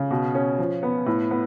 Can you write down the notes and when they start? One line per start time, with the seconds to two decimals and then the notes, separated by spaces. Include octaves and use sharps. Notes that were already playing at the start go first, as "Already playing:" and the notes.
Already playing: C#3
0.11 B2
0.35 C#4
0.59 F3
0.83 B3
1.06 A2
1.31 B3